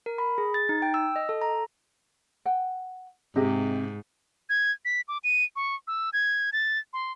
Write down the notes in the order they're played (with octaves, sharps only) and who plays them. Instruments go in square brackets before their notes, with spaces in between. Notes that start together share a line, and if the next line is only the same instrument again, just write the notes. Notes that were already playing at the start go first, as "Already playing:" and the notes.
[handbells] A#4
B5
G#4
A6
D#4
G5
E6
D#5
A4
A#5
[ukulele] F#5 G5
[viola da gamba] G#2 [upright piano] C3 [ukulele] G4 G#4 D#5
[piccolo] G#6
B6
D6
D#7
C#6
E6
G#6
A6
C6